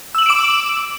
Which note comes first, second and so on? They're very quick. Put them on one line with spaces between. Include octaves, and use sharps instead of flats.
E6 F#7 E7 D7 D6